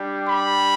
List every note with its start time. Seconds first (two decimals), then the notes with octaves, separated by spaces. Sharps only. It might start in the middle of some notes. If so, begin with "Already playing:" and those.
Already playing: G3 D4 G4
0.29 B5